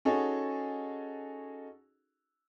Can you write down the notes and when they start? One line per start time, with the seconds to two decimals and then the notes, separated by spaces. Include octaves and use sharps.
0.05 C#4 D#4 F#4 G#4 A4